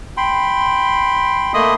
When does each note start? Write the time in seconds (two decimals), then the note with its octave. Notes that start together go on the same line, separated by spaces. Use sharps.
0.17 G5 B5 C6
1.54 A3 A#3 D#5 B5 C6 D#6